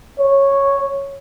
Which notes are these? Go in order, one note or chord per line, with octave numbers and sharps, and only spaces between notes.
C#5